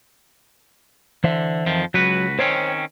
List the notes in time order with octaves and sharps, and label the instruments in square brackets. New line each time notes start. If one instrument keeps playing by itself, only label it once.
[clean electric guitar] D3 [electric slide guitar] E3 C5 E5
[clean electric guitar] F2 D#3 F3
[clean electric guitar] C#2 F#4 B4 [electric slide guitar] F#3
[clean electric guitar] D#3 C4 C#4 [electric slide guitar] C5 C#5